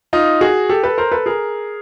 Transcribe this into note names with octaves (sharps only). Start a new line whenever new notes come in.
D#4 F4
F#4 G#4
G4 A4
A4 B4
A#4 C5
A4 B4
G#4 A#4